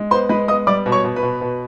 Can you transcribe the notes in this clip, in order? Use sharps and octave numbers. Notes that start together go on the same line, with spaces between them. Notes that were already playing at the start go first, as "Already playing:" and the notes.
Already playing: G#3
B3 C5 C6
G#3 B4 B5
B3 D#5 D#6
G3 D5 D6
B2
C#5 C#6
B2
B4 B5
B2
B2